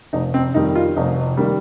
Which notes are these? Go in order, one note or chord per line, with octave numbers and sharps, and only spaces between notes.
F1 D#4
C4
F2 D#3 G3 D#4
F4
F1 D#4
D#3 G3 A#3